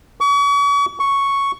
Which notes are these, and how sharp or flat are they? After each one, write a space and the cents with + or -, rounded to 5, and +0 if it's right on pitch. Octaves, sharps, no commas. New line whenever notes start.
C#6 +40
C#6 +0